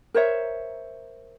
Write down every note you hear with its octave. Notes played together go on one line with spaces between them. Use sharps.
A#4 C5 C#5 E5